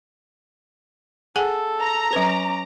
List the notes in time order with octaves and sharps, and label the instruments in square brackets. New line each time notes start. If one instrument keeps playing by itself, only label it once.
[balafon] G#4 F#5 G#5 [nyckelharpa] A4
[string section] A#5
[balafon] F#3 B4 [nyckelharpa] C#4 D6